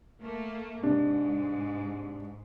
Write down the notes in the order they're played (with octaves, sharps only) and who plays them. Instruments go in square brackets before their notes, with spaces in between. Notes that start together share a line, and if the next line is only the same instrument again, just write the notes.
[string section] A3 A#3
[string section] G#2 [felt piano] C3 [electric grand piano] D4